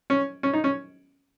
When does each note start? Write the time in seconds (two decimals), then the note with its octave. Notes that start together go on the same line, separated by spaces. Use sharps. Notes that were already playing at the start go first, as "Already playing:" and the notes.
0.10 C#4
0.43 C#4
0.53 D#4
0.64 C#4